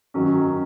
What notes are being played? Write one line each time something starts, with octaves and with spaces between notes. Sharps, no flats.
F#2 D#3 F#3 C#4